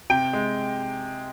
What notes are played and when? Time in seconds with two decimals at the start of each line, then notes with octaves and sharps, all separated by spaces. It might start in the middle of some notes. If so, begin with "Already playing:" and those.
0.10 C3 G5
0.33 G#3